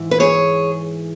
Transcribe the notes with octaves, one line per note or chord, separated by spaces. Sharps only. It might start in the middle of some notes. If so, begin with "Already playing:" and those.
Already playing: G#2 E3
B4
G#4 C#5